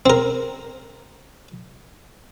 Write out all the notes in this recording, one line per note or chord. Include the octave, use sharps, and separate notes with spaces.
C4 A#4